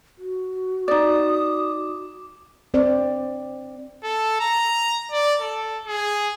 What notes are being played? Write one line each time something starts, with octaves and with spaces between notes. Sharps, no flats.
F#4
D#4 D5 D6 D#6
C4 C5 D5
A4
A#5
D5
A4
G#4